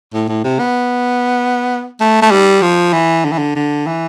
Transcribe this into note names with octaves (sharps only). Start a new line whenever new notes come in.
A2
A2
C3
B3
A3
A3
G3
F3
E3
D3
E3
D3
D3
E3